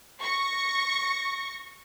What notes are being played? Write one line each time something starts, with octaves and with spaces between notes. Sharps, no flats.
C#6 A#6